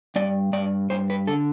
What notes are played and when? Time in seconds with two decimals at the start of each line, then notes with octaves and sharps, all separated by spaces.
0.16 G2 D5
0.53 G2 D5
0.90 G2 C5
1.10 B4
1.27 D3 A4